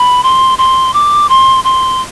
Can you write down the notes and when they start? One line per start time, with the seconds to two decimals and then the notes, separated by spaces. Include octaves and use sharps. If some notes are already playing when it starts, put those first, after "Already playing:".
Already playing: B5
0.23 C6
0.58 C6
0.94 D6
1.29 C6
1.64 C6